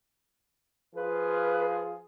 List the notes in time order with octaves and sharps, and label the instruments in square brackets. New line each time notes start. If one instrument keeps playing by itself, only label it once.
[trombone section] F3 F4 G#4 [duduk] B4